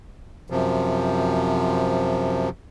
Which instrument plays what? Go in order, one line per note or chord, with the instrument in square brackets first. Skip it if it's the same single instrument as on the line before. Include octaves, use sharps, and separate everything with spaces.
[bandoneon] F#2 C3 F3